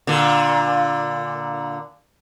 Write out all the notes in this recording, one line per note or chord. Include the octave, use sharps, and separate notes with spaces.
A#2 D3